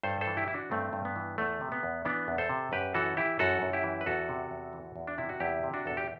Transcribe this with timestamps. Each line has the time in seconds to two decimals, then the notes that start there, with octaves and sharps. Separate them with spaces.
0.03 G2 A4 C5
0.21 A4 C5
0.27 E3
0.37 E4 G4
0.48 E3 E4
0.54 D4 F#4
0.71 G2 A3 C4
0.93 G2
1.05 B3
1.16 E3
1.38 E2 A3
1.61 C3
1.72 B3
1.83 E2
2.05 E3 B3 D4
2.28 E2
2.38 A4 C5
2.49 C3
2.72 F#2 G4 B4
2.94 E3 F#4 A4
3.17 E3 E4 G4
3.39 F#2 F#4 A4
3.62 F#2
3.73 E4 G4
3.84 E3
4.01 B4
4.06 E2 F#4 A4
4.29 C3
4.51 E2
4.73 E3
4.96 E2
5.07 D4
5.18 C3 E4
5.29 F#4
5.40 E2 E4 G4
5.63 C3
5.74 D4 F#4
5.86 E2 A4
5.97 G4